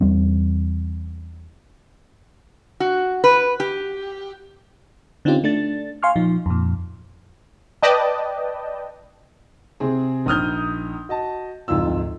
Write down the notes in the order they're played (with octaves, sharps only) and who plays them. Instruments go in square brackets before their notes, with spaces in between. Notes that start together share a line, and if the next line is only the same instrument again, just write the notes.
[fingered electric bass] E2 G3 C4
[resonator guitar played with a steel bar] F#4
B4
G4
[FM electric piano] D3 C4 C#4 D#4 F4 G4
A3 D4 A6
F5 G#5 C6 C#6 F6
A#2 F3 D#4
F2 A#2
[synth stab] B4 D5 D#5 G5 A5
[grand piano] C3 C4 G#4
A#1 D#4 D#6 F6 G6
F#4 D#5 A5
D1 F2 G#2 F4 E6